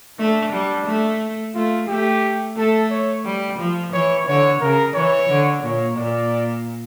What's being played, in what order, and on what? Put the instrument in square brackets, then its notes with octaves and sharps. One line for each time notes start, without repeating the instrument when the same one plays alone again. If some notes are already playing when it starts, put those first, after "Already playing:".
[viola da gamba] A3 [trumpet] D4
[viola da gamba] G3
A3
[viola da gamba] A3 [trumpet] F4
[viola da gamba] A3 [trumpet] G4
[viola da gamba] A3 [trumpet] A4
[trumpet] C#5
[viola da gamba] G3
F3
[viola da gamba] E3 [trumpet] C#5
[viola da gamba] D3 [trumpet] C#5
[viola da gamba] C#3 [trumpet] A#4
[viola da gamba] E3 [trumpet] C#5
[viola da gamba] D3
[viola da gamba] A#2 [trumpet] C#5
[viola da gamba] A#2 [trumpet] D5